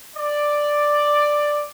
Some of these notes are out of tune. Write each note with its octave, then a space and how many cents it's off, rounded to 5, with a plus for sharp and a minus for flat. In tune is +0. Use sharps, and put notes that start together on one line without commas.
D5 +5